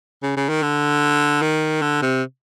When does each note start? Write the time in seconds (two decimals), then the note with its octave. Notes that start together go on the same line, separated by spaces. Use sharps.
0.23 C#3
0.37 C#3
0.49 D#3
0.63 D3
1.42 D#3
1.82 D3
2.02 C3